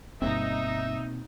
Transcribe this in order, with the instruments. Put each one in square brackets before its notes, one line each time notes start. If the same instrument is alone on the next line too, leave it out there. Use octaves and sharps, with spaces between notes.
[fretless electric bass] G1 G2 [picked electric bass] B2 A#3 C4 [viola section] D#4 [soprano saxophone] E5